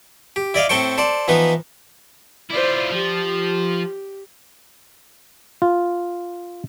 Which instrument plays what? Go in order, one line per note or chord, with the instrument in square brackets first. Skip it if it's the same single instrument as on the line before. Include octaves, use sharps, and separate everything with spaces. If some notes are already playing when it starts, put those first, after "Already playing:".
[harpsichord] G4
E4 D5 D#5 F5
A2 C4 A4 C5 G5 C#6
A4 C5 D5
E3 F3 B3 D#4 B4
[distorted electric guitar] E4 F4 [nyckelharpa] C5 D5
[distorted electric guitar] F3 [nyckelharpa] G4
[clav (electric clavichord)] F4